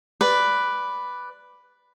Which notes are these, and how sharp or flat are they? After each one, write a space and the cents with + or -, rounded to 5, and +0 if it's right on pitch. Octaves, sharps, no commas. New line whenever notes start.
B4 +0 D5 +0